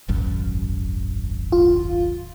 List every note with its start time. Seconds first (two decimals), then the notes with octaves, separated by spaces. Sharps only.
0.08 D#1 G#1 F#2
1.52 F4